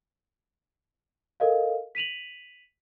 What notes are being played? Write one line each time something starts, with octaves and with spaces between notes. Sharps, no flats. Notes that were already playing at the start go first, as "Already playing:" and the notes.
A4 A#4 D#5 F5
B6 D#7 F7 F#7